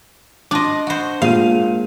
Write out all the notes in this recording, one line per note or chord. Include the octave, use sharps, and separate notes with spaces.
D4 D#5 C6 D6
F#4 C5
A#2 G#3 F5 D#7